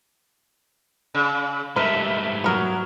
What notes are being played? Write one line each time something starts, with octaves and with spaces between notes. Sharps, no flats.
C#3
G#2 G3 A3 A#4 B4 E5
F#3 B3 A#4